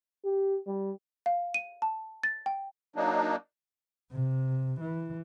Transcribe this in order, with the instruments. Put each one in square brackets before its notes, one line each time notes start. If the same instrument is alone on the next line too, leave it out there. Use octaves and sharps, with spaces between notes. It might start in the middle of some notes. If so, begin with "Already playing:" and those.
[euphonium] G4
G3
[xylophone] F5
D#7
A5
A6
G5
[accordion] F#3 A#3 D4 D#4
[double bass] C3
E3